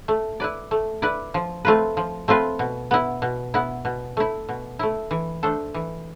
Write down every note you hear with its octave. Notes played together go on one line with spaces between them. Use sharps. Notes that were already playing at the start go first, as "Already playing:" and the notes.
A3
E4 B4 D5
A3
E4 B4 D5
F3
A3 C4 F4 B4
F3
A3 C4 F4 B4
B2
B3 E4
B2
B3 E4
B2
A3 E4
B2
A3 E4
E3
A3 D4 A4 C5
E3